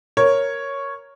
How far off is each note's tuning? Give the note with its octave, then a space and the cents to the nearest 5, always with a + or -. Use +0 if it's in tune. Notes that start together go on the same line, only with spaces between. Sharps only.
A#4 +0 C#5 +0